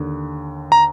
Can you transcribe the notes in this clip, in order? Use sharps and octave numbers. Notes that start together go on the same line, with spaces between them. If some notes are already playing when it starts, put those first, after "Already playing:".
Already playing: D#2 D3
A#5